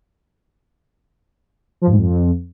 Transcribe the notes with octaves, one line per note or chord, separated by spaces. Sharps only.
F3
G2
G#2
F2